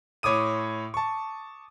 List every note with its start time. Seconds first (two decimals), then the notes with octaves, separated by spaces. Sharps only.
0.23 A2 C#5 D6 D#6 D#7
0.94 A5 C#6